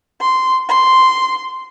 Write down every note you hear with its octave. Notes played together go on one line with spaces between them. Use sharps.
C6
C6